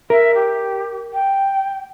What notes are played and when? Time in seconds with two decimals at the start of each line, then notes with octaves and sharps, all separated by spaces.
0.10 A#4 E5
0.34 G4
1.13 G5